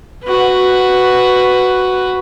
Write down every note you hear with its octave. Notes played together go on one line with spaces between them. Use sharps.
F#4 B4